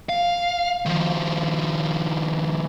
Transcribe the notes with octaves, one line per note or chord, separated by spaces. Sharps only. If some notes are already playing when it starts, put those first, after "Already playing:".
F5
D#3 F3